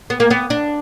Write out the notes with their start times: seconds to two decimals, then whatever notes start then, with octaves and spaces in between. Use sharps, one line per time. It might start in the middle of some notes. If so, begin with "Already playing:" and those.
0.10 B3
0.20 A#3
0.30 B3
0.50 D4